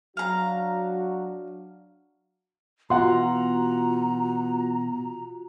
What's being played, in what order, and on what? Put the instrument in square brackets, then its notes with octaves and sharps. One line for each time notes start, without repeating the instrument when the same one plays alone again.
[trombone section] F#3 D4 F#4 [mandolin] F5 A#5
[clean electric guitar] B2 E3 [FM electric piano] F4 F#4 [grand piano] F#5 C6 [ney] A#5